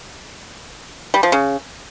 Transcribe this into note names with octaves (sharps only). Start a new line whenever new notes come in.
G3
F3
C#3